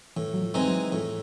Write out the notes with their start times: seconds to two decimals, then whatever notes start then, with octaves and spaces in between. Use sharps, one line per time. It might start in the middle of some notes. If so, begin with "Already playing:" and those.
0.16 A2 E3
0.34 F#3
0.42 F3
0.54 E3 G#3 C4 D#4
0.67 F#3
0.92 A2 F3